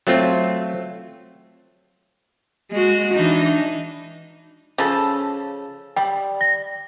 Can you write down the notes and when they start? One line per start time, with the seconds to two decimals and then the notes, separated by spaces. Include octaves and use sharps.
0.07 F#3 A3 C4 F4
2.72 G#3 F#4
3.15 E3 D4 D#4
4.78 C#3 F3 A4
5.97 G3 G5
6.41 A#6